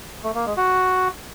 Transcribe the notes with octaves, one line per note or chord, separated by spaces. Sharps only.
A3
A#3
G#3
F#4